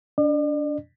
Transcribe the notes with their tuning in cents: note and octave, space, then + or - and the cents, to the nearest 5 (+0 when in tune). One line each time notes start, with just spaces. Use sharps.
D4 -20 D5 +40